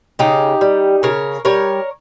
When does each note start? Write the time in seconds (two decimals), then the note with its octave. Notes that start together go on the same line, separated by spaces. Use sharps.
0.19 C#3 D#4 G4
0.61 G3
1.03 C#3 A#4 C#5
1.45 G3 A#4 C#5